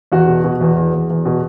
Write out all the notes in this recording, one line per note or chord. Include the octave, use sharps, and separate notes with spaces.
E2 F#4
B2
B2
E2
E2
E2
E2
B2